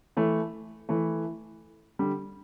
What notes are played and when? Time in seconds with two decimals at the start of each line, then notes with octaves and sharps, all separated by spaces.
0.17 E3 A3
0.89 E3 A3
1.99 D3 G3